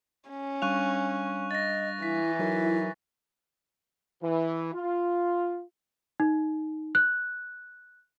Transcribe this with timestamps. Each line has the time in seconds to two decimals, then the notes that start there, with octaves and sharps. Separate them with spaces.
0.29 C#4
0.62 G3 D4 F5 C#6 F#6 F7
1.51 D#5 A6 A#6
2.03 E3 E4 B6
2.39 F#3 D#4 E4 A#4
4.22 E3
4.73 F4
6.20 D#4
6.95 F#6